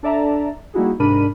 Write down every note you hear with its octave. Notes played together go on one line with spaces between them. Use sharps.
D4 A4 D5 E5 A5 A#5
G3 A#3 D#4 E4 F#4 G#4
G#2 C3 D4 A#4 B5 D#7